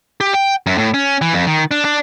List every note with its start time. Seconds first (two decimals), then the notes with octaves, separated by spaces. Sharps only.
0.21 G4
0.34 G5
0.67 F#2
0.78 A2
0.94 C#4
1.21 E3
1.33 F2
1.47 D#3
1.71 D4
1.85 D4